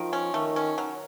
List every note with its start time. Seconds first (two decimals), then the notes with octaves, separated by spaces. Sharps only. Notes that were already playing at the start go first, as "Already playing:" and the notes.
Already playing: D#3 F3
0.13 C#4
0.34 D#3 A3
0.56 C#4
0.78 F#3